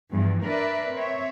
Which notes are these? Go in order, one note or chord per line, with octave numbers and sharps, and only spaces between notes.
E2 G2 F3
D4 A#4 B4 D5 E5
C4 C#5 E5